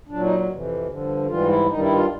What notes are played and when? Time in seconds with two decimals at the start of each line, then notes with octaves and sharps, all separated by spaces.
0.08 A#2 F#3 D4
0.22 D#4
0.48 F2 C3 E3
0.87 G2 D3 F3
1.26 G#2 E3 G3 F4
1.47 E4
1.66 G2 D#3 G3 D#4
1.79 E4
1.93 F4